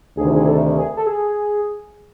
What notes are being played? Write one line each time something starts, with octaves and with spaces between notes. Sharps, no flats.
D2 C3 D#3 G#4
G#4
A4
G#4
A4
G#4